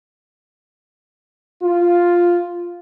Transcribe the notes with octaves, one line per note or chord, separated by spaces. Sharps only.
F4